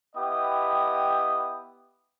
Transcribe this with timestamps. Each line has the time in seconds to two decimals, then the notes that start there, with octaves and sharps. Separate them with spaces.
0.15 B3 E4 G4 D#5 G5 D#6